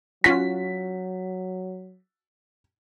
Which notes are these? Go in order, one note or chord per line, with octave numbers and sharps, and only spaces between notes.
F#3 C#4 F4 F#4 B6